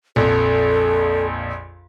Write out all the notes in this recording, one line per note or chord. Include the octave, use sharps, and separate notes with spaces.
A#1 F2 A4